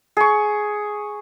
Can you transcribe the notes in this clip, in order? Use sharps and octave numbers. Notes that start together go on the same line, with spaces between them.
G#4 C#6